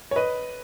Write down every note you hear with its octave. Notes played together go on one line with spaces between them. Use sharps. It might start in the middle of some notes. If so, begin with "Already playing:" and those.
C#5
B4 D#5